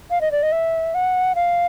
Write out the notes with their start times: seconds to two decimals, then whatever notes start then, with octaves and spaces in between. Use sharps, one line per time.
0.10 F5
0.21 D#5
0.32 D5
0.43 D#5
0.52 E5
0.95 F#5
1.35 F5